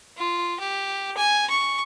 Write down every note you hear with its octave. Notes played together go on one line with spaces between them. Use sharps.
F4
G4
G#5
C#6